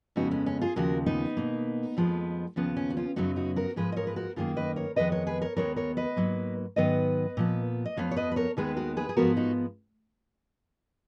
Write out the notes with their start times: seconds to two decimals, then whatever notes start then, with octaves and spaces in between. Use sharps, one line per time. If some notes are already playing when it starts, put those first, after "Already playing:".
0.16 F2 C#3 G#3 B3 D#4 F#4
0.31 C#4
0.46 C#4
0.61 F4 G#4
0.76 D#2 C#3 F3 G#3 F#4 A#4
1.06 B3 D#4
1.37 B2 A#3
1.97 F2 F3 G#3 B3
2.56 D#2 C#3 F3 B3 C#4
2.77 C#4
2.90 F#4
2.97 C#4 F4
3.16 F#2 C#3 F#3 B3 D#4 F#4
3.36 D#4 F#4
3.56 F#4 A#4
3.76 G#2 F3 G#3 G#4 B4
3.92 D#5
3.96 A#4 C#5
4.07 B4
4.16 F#4 A#4
4.36 F#2 D#3 A#3 F4 G#4
4.57 B4 D#5
4.76 A#4 C#5
4.96 F2 D#3 G#3 B3 B4 D#5
5.12 A#4 C#5
5.27 G#4 B4
5.42 A#4 C#5
5.57 D#2 C#3 G#3 B3 A#4 C#5
5.76 A#4 C#5
5.97 B4 D#5
6.16 G#2 F#3 A#3
6.76 G#2 D#3 F#3 B3 B4 D#5
7.37 A#2 F3 B3
7.85 D#5
7.97 F2 F3 B3 C#5 F5
8.11 C#5
8.16 B4 D#5
8.32 B4
8.36 A#4 C#5
8.57 D#2 D#3 G#3 B3 G#4 B4
8.77 F#4 A#4
8.97 G#4 B4
9.09 G#4
9.16 G#2 F3 G#3 B3 F#4 A#4
9.37 D#4 F#4